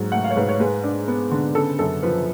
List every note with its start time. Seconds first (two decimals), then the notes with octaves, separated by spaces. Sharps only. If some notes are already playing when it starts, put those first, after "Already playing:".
Already playing: G#2 F#3
0.12 A3 F#5
0.24 F5
0.31 C#5
0.36 G#2 B4
0.49 C#5
0.60 G#3 B4
0.84 D4
1.08 B3
1.31 D3
1.55 C#3 A4
1.79 F#2 A4
2.03 F3 B4